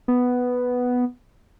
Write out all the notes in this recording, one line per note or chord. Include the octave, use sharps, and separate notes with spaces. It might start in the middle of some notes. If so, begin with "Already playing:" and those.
B3